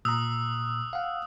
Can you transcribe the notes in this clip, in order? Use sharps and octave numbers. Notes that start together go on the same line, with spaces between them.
A#2 A#5 D#6 E6 F#6
F5 F#5